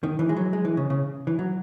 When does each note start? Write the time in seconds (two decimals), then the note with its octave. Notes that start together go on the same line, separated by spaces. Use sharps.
0.03 D#3
0.19 E3
0.29 G#3
0.37 F#3
0.53 G#3
0.65 E3
0.77 C#3
0.90 C#3
1.27 E3
1.39 F#3